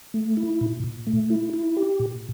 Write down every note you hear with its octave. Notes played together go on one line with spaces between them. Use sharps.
A3
E4
A#2
A#2
A3
E4
E4
G4
A#2